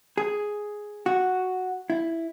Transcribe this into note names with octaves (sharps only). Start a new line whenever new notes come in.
G#4
F#4
E4